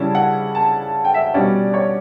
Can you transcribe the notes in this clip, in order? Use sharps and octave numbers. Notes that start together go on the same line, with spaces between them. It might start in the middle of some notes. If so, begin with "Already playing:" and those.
Already playing: C#3 G3 C#4 E4 A5
F#5
A5
G5
E5
B2 G3 C#4 D5
C#5